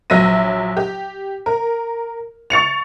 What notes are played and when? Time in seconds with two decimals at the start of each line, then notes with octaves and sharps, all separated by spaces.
0.10 A#1 F#3 E5 A#6 D#7
0.77 G4
1.46 A#4
2.50 C#6 A6 C#7 F7